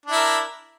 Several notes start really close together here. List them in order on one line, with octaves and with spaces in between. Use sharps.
D4 E4 A#4